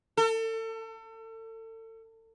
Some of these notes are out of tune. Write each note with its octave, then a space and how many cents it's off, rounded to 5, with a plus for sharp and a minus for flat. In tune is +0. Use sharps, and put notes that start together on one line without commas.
A4 +35